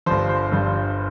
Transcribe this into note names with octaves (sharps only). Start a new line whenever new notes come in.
G1 G2 F3 C5
C5
G1 G2 F3